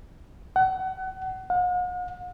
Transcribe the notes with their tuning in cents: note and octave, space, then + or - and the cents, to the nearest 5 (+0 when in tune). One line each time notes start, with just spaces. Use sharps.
F#5 +25
F#5 -45